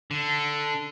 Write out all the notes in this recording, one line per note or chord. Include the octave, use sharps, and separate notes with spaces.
D3